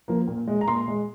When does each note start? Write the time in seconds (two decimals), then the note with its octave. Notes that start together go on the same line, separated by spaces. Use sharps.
0.08 F3 A#3
0.28 A#2
0.48 G#3
0.61 A#5
0.68 A#2 C6
0.88 G#3